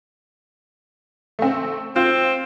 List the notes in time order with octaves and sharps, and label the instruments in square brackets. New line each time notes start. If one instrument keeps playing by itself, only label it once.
[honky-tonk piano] A3 C4
[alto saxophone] C4 [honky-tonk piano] F4